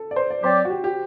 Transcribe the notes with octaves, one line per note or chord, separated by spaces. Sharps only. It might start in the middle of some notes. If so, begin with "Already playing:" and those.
Already playing: A4
D5
C5
D5
F#3 C4 G4 C5 D5
F#4
G4
G4